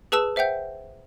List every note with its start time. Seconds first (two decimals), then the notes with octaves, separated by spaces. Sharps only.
0.12 G#4 B4 A5 E6 E7
0.36 C5 E5 F#5 G5 G6